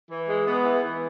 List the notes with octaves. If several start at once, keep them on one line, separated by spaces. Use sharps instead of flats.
E3
G#3
B3
E3
E3